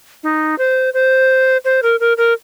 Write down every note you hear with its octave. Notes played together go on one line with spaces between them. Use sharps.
D#4
C5
C5
C5
A#4
A#4
A#4